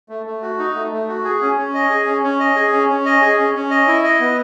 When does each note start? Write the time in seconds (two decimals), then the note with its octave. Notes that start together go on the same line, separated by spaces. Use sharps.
0.09 A3
0.26 A3
0.42 F#4
0.59 D#4
0.75 A3
0.92 A3
1.08 F#4
1.24 G#4
1.41 C#4
1.57 C#4
1.74 D#5
1.90 G#4
2.06 C#4
2.23 C#4
2.40 D#5
2.56 G#4
2.72 C#4
2.89 C#4
3.06 D#5
3.22 G#4
3.39 C#4
3.55 C#4
3.70 D#5
3.87 E4
4.04 D#5
4.20 B3